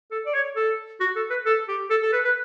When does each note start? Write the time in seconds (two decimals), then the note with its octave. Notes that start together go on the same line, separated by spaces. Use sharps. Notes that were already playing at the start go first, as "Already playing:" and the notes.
0.11 A4
0.26 D5
0.34 C#5
0.56 A4
1.00 F#4
1.16 A4
1.30 B4
1.46 A4
1.68 G4
1.90 A4
2.02 A4
2.12 B4
2.24 B4